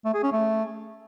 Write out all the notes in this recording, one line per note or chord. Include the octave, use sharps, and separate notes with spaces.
A3
G#4
C#4
A3